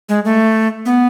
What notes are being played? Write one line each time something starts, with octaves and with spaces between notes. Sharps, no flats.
G#3
A3
B3